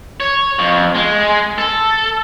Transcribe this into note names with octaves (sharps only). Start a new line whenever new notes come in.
C#5
F2
G#3
A4